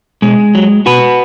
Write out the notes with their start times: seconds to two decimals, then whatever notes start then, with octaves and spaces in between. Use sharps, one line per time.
0.22 B2 G#3
0.55 F#3
0.86 B2 F#4 B4